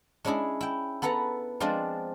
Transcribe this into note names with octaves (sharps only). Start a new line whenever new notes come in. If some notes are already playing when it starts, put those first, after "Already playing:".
G#3 C#4 D4 E4 G#4
E4 G5
B3 A4 B4 F#5 A#5
F3 G#3 C4 D4 C5 D5